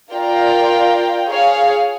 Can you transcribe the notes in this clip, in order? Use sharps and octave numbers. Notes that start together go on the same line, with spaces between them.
F4 A#4 D5 F5 G5
G#4 C#5 F5